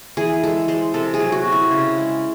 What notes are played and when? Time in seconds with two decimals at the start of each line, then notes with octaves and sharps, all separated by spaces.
0.17 E3 G#4
0.43 G#3 A4
0.68 G#3 C5
0.94 C3 A4
1.14 G#4
1.19 F#3
1.32 F#4
1.45 C4
1.52 E4
1.71 C#3
1.97 G#3